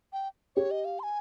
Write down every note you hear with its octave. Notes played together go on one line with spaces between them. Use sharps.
G5
G4 C#5
D#5
F5
C6
G#5